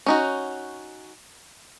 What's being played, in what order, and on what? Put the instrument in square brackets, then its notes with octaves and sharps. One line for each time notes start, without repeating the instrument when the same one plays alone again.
[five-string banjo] C#4 D#4 F#4